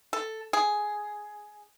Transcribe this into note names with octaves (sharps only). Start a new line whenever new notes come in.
A4
G#4